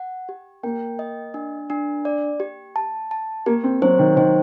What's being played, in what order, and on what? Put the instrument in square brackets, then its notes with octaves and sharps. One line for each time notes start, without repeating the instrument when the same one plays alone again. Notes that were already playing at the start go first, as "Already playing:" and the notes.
Already playing: [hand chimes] F#5
G4
[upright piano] A#3 [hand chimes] G5
[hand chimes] D#5
D4
D4
D5
G4
A5
A5
[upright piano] A#3 [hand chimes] G4
[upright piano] C4
[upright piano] F#3 [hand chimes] C5
[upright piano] D#3
[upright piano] D#3 [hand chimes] C5